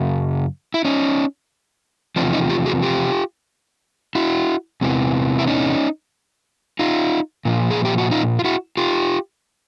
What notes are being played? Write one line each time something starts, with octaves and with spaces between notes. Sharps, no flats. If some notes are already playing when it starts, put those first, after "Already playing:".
Already playing: F#2 C#3
E4
C#4 D#4
E2 C3 F3 C4 D4
C#4 D#4
F4 G4
F#4 G#4
F4 G4
E4 F#4
E2 C3 E3
E4
C#4 D#4
D#4 F4
A#2 F3
G#4
G4
F#4
D#4 F4
F4
E4 F#4
F4 G4